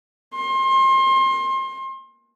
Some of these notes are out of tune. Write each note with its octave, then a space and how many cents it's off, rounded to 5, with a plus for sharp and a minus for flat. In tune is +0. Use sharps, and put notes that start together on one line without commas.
C6 +30